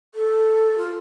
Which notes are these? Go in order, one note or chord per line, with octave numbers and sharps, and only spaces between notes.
A4
F4